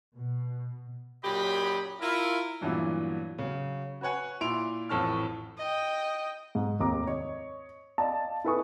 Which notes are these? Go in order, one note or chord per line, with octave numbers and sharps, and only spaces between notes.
B2
F#2 A#2 F#3 G4 D#5 B5
E4 F4 A#4
G2 A#2 E3 F#3 B3 E4
C#3 F#3
F#4 B4 C#5 F#5 G#5
A#2 E4 C6 D7 F7
A1 F2 A2 A5 C#6 F6
D#5 G5
G#2
F1 D#2 A#5 D6
C#5 D#5
D5 D#5 F5 A5
E4 A4 B4 G#5 C#6 D#6